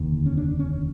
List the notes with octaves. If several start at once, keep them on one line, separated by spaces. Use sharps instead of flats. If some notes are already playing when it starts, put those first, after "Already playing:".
Already playing: F1 D#2 D3
C#4
D4
C#4